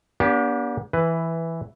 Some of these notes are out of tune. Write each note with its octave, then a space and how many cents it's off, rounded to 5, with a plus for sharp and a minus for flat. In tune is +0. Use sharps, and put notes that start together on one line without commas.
B3 -45 D4 -35 G4 +5
E3 +0 B4 +10